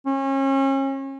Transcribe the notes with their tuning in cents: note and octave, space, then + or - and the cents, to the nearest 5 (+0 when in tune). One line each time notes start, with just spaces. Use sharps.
C#4 -35